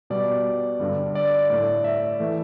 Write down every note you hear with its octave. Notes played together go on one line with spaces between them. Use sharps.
B2 G3 D5
G2 D3 G3
D5
A2 A3
E5
E3 A3